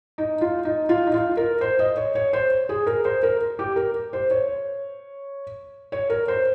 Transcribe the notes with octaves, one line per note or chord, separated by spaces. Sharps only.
D#4
F4
D#4
F4
D#4
F4
A#4
C5
D#5
C#5
C#5
C5
G#4
A#4
C5
A#4
G4
A#4
C5
C#5
C#5
A#4
C5